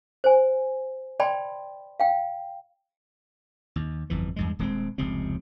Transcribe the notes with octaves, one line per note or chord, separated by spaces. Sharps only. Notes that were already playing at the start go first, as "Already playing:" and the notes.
C5 G#5
D5 G5 A5 B5 C6
F5 G5
D#2
G1 F2 E3
E2 G2 G#3
D#1 G#3 B3 C4
F1 C#2 C3 C4